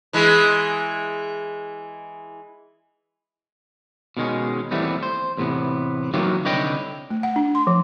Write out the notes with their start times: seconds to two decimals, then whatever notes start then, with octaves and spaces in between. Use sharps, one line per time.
0.13 E3 G#3 E4
4.17 B2 D#3 G#3 C#4
4.71 D#2 E3 G3 A3 B3 C4
5.03 C5
5.37 E2 A2 C3 B3
6.14 D#3 E3 F#3 A#3 F4 G4
6.45 C2 D3 B4 C#5 D#5 G5
7.10 A3
7.23 F#5
7.36 D4
7.55 C6
7.67 F3